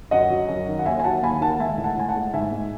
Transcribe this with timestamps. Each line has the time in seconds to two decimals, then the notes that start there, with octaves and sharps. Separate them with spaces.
0.11 F#2 D#5 F#5
0.30 F#3
0.49 F#2
0.67 D#3
0.79 F#5
0.85 D#2 E5 G#5
1.00 G#5
1.04 F#3 F#5 A5
1.22 D#2 G#5 B5
1.41 D#3 F#5 A5
1.59 G#3 E5 G#5
1.78 A2
1.84 F#5 A5
1.97 A2 G#5
2.09 F#5 A5
2.16 G#3
2.33 G#2 E5 G#5
2.52 G#3